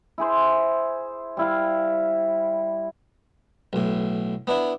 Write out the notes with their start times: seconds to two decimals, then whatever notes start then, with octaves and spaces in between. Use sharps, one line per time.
0.18 E4 G#4 C5
1.37 G3 E4 F5
3.73 B1 A2
4.47 B3 D4 E4